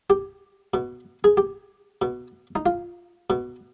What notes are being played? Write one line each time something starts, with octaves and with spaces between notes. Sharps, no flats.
G4
B2
G#4
G4
B2
D#4
F4
B2